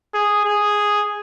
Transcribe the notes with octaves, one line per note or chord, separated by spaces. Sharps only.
G#4
G#4